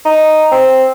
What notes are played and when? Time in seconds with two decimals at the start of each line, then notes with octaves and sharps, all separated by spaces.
0.05 D#4
0.52 C4